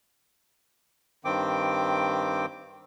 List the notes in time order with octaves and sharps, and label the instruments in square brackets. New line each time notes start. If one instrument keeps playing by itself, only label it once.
[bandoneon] G2 D#3 C4 G5 D6